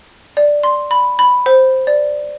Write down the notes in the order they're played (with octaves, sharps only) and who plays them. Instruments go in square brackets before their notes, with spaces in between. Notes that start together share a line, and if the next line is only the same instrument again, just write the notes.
[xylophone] D5
C6
B5
B5
C5
D5